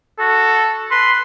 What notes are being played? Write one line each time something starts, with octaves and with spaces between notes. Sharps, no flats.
F#4 A4
B4 C6